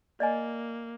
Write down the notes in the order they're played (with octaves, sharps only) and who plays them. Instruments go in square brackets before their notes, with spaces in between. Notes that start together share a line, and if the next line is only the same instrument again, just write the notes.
[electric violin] A#3 [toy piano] D5 D#5 G#5